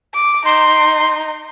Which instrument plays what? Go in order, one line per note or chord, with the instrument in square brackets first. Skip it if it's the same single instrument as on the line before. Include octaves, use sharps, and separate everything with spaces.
[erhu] D6
[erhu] D#4 [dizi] C6